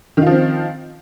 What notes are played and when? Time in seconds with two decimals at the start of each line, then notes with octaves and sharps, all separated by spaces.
0.17 D#3
0.22 F4
0.26 F3
0.31 C4